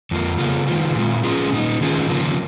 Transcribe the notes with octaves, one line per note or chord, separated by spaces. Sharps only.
F2 F3 A#3
C#3 A#3 F4 G#4
D#3 G#3 F4
A#2 F3 G#3 F4
F3 C#4 F4 G#4
A#2 A#3 D#4
D#3 C#4 F4 G#4
C#3 F3 A#3